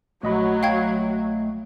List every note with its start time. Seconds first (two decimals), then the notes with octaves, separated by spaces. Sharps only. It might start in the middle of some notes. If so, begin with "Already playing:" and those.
0.23 A#1 F#3 A3 D#5 B5
0.63 F5 G5 G#6